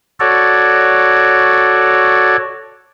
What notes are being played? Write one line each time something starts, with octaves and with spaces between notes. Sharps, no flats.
F#4 A4 C#5 D5